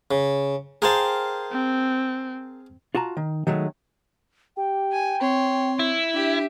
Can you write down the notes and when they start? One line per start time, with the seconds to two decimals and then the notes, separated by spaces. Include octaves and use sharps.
0.11 C#3
0.82 G#4 A#4 C5 F5 G5 A5
1.52 C4
2.95 F4 F#4 A5 A#5
3.17 D#3
3.47 D#3 F#3 G#3 A3
4.57 G4 G5
4.92 G#5
5.21 C4 C#5 C6
5.79 E4
6.14 D4 G4 E5